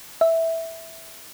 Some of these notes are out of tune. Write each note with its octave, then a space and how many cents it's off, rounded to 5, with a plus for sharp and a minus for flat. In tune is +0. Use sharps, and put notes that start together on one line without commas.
E5 -5